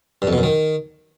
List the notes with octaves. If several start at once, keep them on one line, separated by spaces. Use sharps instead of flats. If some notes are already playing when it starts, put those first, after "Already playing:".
G2
F2
B2
F#2
D#3